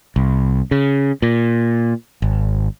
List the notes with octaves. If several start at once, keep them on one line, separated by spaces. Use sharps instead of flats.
C2
C#3
A#2
G#1